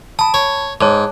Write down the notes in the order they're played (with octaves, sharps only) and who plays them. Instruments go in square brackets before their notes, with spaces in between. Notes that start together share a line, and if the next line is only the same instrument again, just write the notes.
[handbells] A5 B5 [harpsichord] D#6
[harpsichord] C#5
[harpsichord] G#2 [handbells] C#5 A5 D6